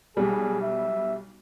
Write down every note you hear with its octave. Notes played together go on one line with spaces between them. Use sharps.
B1 G3 G#4
E5